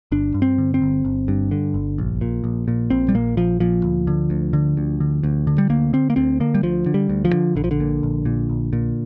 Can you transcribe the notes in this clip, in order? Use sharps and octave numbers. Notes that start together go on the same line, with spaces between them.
G1 D4
G2
C4
D3
C4
G1
G1
G2
D3
G1
A#1
A#2
A#1
A#2
A#1 C4
G3
A#2 A#3
A#1 F3
A#2 F3
D2
D3
D2
D3
D2
D3
D2
D3
G3
D2 A#3
D3 C4
A#3
D2 C4
D3 A#3
G3
D2 F3
D3
G3
D2
F3
D3
A#1 D3
F3
D3
A#2
A#1
A#2
A#1
A#2